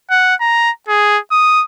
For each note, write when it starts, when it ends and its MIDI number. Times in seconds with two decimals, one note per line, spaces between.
0.11 0.35 78
0.41 0.71 82
0.89 1.18 68
1.32 1.64 87